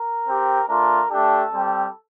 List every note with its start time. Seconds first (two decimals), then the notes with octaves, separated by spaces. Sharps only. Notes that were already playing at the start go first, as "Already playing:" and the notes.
Already playing: A#4
0.27 C4 G4
0.69 A3 D4 F4 A#4
1.11 A3 D4 G4 A4
1.53 G3 C4 G4